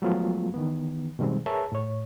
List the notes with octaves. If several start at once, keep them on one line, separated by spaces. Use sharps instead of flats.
F3 F#3 G#3 A3 B3 F4
D#3 E3 B3
B2 D#3 G3 G#3 C4
G#4 A#4 B4 C#5 E5 A5
A2 C#5